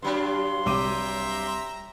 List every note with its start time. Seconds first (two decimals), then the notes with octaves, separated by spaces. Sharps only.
0.02 G2 F#3 D4 C6
0.66 C2 E5 G5 A#5 D6 D#7